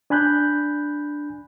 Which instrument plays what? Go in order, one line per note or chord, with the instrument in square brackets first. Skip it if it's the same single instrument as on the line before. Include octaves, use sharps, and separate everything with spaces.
[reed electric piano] D4 G#5 B5 F#6 G6